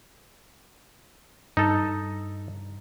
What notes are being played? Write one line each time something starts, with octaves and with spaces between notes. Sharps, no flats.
G2 D#4 A4